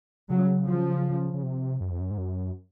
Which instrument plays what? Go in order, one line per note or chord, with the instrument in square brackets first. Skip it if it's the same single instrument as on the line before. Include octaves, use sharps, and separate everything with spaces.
[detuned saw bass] C#3 [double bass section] F#3
[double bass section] F3
[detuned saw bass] C#3
C3
F#2
F2
F#2
G#2
F#2